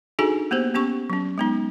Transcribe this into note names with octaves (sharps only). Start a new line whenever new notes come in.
D4 D#4 F#4 G#4 A4 G#5
A#3 B3 G4 C5
B3 C#4 G4 C#6
F#3 C#4
G#3 B3 D#4